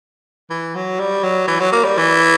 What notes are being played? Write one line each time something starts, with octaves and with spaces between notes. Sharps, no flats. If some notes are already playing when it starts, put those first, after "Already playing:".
E3
F#3
G3
F#3
E3
F#3
A#3
G3
E3